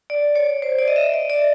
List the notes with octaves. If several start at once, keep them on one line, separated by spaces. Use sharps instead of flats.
D5
C#5
C5
D5
D#5
E5
D#5
D5